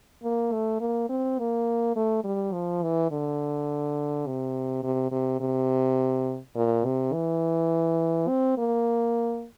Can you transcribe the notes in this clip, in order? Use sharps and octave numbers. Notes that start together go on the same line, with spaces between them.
A#3
A3
A#3
C4
A#3
A3
G3
F3
E3
D3
C3
C3
C3
C3
A#2
C3
E3
C4
A#3